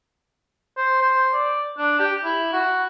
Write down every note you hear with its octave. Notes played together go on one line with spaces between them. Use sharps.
C5
C5
D5
D4
G4
E4
F#4